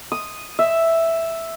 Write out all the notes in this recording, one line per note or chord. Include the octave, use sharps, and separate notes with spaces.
D#6
E5